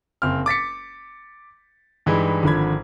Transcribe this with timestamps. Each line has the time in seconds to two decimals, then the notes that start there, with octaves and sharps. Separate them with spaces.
0.22 F#1 C4 F6
0.46 D6 A6 B6 C#7
2.06 G2 E3 G#3 D#4 E4
2.43 G#1 D3 F3 B5 G#6